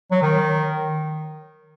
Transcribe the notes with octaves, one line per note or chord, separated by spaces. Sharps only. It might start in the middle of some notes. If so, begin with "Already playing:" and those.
F#3
D#3